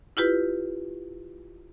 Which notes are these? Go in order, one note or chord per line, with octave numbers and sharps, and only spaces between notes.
E4 F4 G4 B4